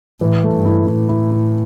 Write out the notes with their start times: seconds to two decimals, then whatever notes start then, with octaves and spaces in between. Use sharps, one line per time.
0.21 A2 E3
0.43 A3
0.54 G2
0.65 E4
0.86 A2 E4
1.09 E4
1.31 E4